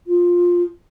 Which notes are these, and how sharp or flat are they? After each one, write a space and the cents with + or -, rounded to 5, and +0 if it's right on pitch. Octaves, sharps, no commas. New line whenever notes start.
F4 +10